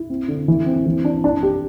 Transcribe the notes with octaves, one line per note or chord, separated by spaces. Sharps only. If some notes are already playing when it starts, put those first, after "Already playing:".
Already playing: E4
C4
D3
E3
C4
E3
D4
D4
G4